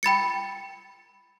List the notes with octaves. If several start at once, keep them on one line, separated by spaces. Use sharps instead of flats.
G5 B5 A6 C#7